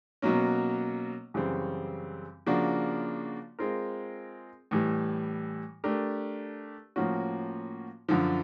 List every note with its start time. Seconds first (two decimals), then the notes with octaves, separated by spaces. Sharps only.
0.22 B2 F#3 A#3 C#4
1.34 F#2 C#3 E3 G3 C4
2.46 C#3 F3 A#3 D4 F#4
3.59 G#3 C4 F4 A#4
4.71 A2 E3 G3
5.84 A3 D4 G4 A#4
6.96 A2 F3 A#3 C#4 F#4
8.09 F#2 D3 F3